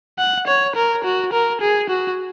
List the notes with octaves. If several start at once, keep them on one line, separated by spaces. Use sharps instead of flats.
F#5
C#5
A#4
F#4
A#4
G#4
F#4